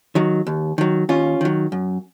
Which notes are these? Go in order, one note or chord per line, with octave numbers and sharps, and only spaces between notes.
D#3 F#3
D#2
D#3 F#3
D#2 C#4 F4
D#3 F#3
F#2